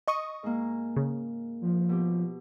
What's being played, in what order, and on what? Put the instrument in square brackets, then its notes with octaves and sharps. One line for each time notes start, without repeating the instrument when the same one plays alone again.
[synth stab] D#5 C#6 D#6
[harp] G#2 A#3
[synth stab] C#3
[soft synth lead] F3
[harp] B2 G4